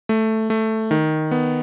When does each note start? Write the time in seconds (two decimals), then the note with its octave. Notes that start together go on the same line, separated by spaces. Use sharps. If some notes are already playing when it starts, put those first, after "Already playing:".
0.09 A3
0.50 A3
0.91 D#3
1.31 B3